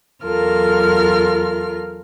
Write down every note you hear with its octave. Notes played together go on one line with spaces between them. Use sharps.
E2 F#3 F4 A4 A#4 F6